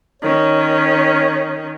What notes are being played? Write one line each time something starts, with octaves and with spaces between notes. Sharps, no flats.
D#3 C#4 C#5